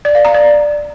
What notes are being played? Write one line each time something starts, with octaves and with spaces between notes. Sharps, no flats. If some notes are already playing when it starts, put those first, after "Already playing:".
D5
F5
A#5
D5